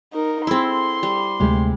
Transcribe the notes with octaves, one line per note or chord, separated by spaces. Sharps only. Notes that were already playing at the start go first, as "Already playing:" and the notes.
D#4 A#4
C4 E4 G#4 A4 C6
G3
D2 C3 G#3 A3 G4